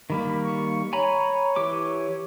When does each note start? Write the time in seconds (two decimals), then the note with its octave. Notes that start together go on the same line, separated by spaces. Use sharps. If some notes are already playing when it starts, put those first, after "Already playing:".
0.10 D#3 G3 A#3 B5
0.42 C#6
0.93 C#5 G#5 A#5 B5
1.56 E3 G4 D6